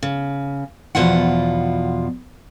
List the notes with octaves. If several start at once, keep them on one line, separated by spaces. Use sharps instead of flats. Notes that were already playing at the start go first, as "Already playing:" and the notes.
C#3
E2 B2 F3 F4 F#5